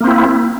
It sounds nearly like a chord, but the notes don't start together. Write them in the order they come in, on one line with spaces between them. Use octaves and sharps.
A#3 C4 E4